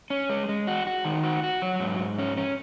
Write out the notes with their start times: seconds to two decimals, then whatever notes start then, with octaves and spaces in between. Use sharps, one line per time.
0.10 C#4
0.30 G#3
0.49 G#3
0.67 F#4
0.87 F#4
1.05 D#3
1.24 F#4
1.43 F#4
1.62 F#3
1.80 G#2
2.00 G#2
2.19 C#4
2.37 C#4